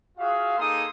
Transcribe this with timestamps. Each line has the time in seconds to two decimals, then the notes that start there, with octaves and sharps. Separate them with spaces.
0.18 F4 F#4 G#4 E5 F5
0.58 A#3 D#4 G#4 A4 C6 D#6